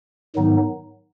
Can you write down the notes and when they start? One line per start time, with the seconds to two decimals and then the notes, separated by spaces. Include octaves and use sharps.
0.36 G#2 D#3 F#3 B3 D#4